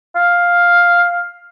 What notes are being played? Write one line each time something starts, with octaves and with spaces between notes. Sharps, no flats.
F5